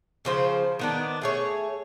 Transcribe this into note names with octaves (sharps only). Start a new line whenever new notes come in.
C#3 F3 C5
D#3 B3 D4
A3 G#4 C#5